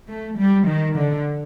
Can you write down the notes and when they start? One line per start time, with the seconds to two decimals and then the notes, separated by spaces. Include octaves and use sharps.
0.08 A3
0.38 G3
0.67 D#3
0.96 D3